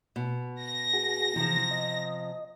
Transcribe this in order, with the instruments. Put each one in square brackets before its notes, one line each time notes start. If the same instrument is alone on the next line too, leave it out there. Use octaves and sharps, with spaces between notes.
[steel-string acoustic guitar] B2
[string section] A#6
[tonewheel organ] F#4 G#4
[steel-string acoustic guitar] C3 F3 [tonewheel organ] E3
[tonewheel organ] D#5